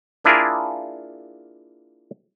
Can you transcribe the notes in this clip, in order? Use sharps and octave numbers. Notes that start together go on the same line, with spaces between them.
A#3 D4 E4 F4 G#4 A#4